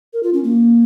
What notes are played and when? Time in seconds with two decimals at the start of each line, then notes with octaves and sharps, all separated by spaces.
0.13 A#4
0.23 F4
0.34 C#4
0.44 A#3